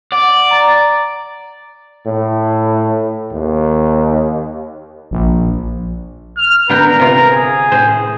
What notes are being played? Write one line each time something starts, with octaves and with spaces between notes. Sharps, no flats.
D5 F#5
A#5 A6
A2
D#2
A#1
F6
D3 B3 A#4 G5
C3 F4
G#4
A2 C5